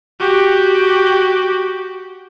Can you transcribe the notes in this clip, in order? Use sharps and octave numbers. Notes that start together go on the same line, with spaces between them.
F#4 G4